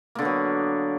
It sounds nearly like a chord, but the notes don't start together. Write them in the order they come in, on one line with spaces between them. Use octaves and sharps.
A#3 D3 B3 F#3